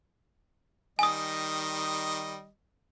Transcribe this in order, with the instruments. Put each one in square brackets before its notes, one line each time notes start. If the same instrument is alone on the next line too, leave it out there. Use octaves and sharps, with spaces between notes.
[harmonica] D#3 G3 D#5 [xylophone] G#5 D#6